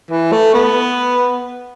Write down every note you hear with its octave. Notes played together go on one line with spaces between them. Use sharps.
E3
A3
B3